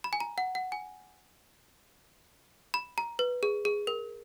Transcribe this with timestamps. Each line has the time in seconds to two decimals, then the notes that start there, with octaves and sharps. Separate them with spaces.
0.04 B5
0.13 G#5
0.20 A#5
0.38 F#5
0.55 F#5
0.72 G#5
2.74 B5
2.98 A#5
3.19 B4
3.43 G#4
3.65 G#4
3.87 A#4